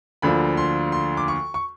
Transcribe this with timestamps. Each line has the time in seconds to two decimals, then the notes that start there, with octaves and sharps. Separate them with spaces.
0.22 D2 D3 F3 A#3 B5
0.57 C6
0.92 C6
1.17 D6
1.28 C#6
1.54 C#6